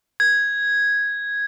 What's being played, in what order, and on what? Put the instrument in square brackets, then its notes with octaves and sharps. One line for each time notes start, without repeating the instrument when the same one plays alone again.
[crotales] G#6